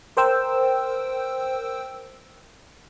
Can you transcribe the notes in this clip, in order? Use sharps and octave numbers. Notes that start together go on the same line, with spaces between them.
A#4 C5 G5 E6